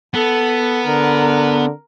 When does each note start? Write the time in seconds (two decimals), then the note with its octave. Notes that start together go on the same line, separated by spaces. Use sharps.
0.14 B3 A4
0.87 D3 A#4